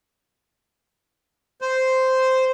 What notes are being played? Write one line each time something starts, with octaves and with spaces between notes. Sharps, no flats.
C5